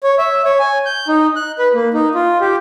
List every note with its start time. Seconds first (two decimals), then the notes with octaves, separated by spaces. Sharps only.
0.03 C#5
0.18 E5
0.45 C#5
0.59 G#5
0.86 G6
1.08 D#4
1.36 F#6
1.59 B4
1.74 A#3
1.94 D#4
2.15 F4
2.41 G4